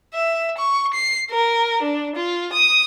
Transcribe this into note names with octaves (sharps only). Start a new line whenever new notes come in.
E5
C#6
C7
A#4
D4
F4
D#6